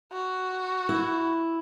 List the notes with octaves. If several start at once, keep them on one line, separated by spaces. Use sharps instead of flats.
F#4
E4